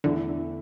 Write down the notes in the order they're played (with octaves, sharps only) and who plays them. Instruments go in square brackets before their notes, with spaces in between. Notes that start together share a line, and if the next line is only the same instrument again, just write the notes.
[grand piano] E2 E3 A3 E4 [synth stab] D3